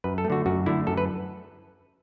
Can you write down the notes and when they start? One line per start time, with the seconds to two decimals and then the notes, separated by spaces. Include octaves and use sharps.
0.04 F#2 B4
0.18 A4
0.25 A3
0.30 D3 F#4
0.46 F#2 F#4
0.66 D3 A3 E4
0.87 F#2 A4
0.98 B4